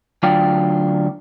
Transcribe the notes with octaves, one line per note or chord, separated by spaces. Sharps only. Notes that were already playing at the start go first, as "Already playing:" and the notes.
D2 F#3 D4 F4 D5 G5